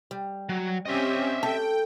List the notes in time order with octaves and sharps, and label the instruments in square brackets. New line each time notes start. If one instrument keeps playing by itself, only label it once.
[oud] G3
[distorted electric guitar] F#3
[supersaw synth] C4 C#4 G4 [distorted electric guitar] D#5 E5
[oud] A4 [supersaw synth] G5